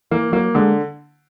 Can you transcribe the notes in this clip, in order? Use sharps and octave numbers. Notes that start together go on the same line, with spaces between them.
E3 A#3
F#3 A#3
D3 G#3